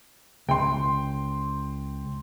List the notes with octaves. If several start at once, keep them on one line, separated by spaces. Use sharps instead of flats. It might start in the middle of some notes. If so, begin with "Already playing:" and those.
C#2 G5 C6